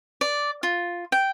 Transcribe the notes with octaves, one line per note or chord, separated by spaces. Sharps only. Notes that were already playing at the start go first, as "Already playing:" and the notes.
D5
F4
G5